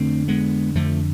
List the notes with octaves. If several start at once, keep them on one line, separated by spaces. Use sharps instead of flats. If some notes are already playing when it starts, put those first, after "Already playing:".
Already playing: F2 D3 A3 C4
G#3 B3
F2 D3 F3 A3